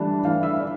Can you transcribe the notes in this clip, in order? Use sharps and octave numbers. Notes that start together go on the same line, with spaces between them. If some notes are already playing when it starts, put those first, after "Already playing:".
Already playing: E3 G3 D4 A5
E3 F5
E5
D4